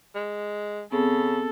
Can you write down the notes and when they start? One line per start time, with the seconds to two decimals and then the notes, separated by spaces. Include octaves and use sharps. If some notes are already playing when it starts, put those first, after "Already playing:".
0.15 G#3
0.92 C#3 B3 C4 G#4 A4